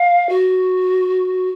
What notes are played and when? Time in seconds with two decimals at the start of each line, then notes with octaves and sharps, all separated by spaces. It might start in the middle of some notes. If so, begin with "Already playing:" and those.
Already playing: F5
0.29 F#4